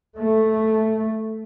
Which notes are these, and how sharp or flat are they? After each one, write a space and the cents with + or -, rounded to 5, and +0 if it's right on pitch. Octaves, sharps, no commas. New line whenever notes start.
A3 -5